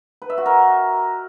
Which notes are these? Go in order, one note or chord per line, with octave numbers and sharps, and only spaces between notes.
B4
E5
F#4
A#4